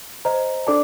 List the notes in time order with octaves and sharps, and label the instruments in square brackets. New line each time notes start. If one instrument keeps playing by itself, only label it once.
[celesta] C5 D#5 A#5
D4 A4 D5 A5 D6